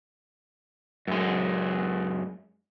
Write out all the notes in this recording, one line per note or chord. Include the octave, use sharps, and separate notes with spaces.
F#2 G#3